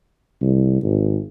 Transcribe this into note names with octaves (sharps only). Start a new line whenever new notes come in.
C2
G#1